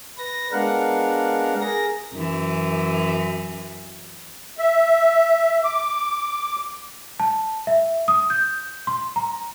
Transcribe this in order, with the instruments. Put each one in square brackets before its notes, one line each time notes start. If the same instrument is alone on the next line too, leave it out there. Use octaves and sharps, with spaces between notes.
[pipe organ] B4 A#6
G#3 B3 D4 A#4 F5 F#5
G#4 A#4 A#6
[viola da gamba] F#2 E3
[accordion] E5
D6
[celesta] A5
E5
D#6
G6
C6
A#5